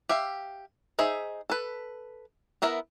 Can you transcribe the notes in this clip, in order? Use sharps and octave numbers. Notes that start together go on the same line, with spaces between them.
G4 E5 F5
D#4 G#4 C5 E5
A4 B4
B3 E4 A#4 E5